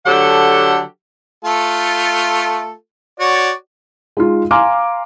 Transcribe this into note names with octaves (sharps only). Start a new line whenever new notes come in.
D3 F#3 G4 A4 F#5
A3 F4 A4
F#4 C#5 D5
G#3 D#4 F4
F5 G#5 A#5 C6 D6 F6